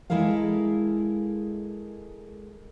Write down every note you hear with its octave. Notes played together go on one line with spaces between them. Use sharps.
G#3 E4 A4 A#4 F5